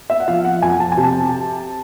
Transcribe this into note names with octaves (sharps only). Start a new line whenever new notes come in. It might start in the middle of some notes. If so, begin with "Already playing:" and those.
E5
F#5
F3 F5
F#5
F2 G#5
A5
G#5
C3
A5